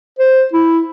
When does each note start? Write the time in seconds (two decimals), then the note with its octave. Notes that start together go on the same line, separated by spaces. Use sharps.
0.19 C5
0.53 E4